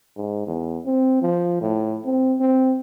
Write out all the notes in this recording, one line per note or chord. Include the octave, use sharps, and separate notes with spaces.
G#2
E2
C4
F3
A2
C4
C4